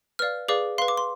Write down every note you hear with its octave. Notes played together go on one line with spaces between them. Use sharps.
B4 D5 F5 F6
G#4 B4 D5 F5 D6
B4 F5 C6
D6
C6